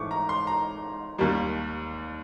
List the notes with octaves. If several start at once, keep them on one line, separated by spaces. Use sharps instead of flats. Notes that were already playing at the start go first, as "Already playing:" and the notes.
Already playing: G#1 G#2 E3 A3 C#6 D6
A#5
C6
A#5
D#2 D#3 G3 A#3